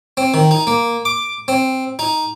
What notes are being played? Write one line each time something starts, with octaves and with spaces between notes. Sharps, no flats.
C4
D#3
D#4
A#3
D6
C4
D#4